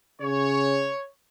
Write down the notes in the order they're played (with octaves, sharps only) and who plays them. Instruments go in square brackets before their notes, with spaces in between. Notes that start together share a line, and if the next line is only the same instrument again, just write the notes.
[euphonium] C#3 [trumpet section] C#5